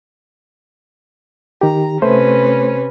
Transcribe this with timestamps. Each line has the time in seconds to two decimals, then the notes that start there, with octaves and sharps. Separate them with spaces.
1.61 D#3 G4 A#5
2.02 C3 A3 C#4 B4 C5